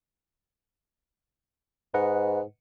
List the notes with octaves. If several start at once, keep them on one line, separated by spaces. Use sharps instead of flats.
G#2 B4 D#5 F#5